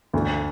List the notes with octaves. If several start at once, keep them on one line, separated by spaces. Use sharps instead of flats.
D2